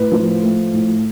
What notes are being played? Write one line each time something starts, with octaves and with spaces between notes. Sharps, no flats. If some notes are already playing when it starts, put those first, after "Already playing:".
Already playing: A2 B4
F3
A3
A2